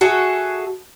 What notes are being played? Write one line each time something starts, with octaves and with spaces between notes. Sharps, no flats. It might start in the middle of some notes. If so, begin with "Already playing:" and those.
F#4 G#4 A4 E5